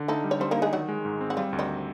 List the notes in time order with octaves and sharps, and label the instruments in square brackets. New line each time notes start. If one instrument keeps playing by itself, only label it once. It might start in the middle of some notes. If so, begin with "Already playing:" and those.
Already playing: [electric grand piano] D3
[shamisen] A3 A4 [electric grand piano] D#4
[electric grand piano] G3
[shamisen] C#5
[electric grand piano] G3 [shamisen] C4 C5
[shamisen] A#3 A#4 [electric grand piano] D#4
[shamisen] G#3 G#4
[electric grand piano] D#3 [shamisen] F#3 F#4
[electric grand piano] G#3
G#2
C4
[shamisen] F#4
[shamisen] F3 F4 [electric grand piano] G3
[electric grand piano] D2
[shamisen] D#3 D#4